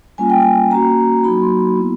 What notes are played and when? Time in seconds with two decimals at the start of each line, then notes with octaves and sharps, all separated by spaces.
0.18 G3 A#3 C#4 F4 G#5
0.30 G5
0.42 G#5
0.71 A#3 C#4 F#4 A#5
1.24 F#3 A#3 D#4 F#4 B5
1.42 C6
1.77 B3 E4